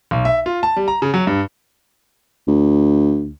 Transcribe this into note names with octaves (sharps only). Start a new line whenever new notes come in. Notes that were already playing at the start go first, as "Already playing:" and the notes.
B1
E5
F4
A5
G3
A#5
C#3
F#3
G2
D2